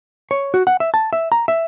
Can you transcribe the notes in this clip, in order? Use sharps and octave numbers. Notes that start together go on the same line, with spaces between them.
C#5
F#4
F#5
E5
A5
E5
A#5
E5